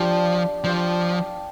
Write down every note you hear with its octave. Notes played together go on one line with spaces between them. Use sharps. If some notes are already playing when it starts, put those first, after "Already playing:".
Already playing: F3 D4 G4 F5
F3 D4 G4 F5